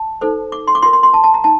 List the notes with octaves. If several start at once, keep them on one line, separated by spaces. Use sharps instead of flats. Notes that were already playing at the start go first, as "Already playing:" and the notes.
Already playing: A5
D#4 A4 C5
D6
C6
D6
F4 A#4 C6
C6
C6
A5
A5
A#5
D#4 A5